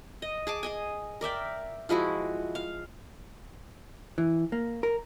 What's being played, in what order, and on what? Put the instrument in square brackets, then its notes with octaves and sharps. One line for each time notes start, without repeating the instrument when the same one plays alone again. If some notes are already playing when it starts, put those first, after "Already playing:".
[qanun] D#5
G#4 A5 D6
G#4 D#5 G#5
A#4 D5 E5 G5
F3 G#3 E4 F#4
F5
[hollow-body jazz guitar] E3
A#3
A#4